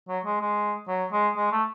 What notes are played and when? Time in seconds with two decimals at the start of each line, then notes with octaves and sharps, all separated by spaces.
0.08 F#3
0.25 G#3
0.41 G#3
0.88 F#3
1.12 G#3
1.36 G#3
1.52 A3